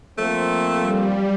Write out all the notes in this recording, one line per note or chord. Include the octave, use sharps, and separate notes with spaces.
F3 A3 A#3 C4
G3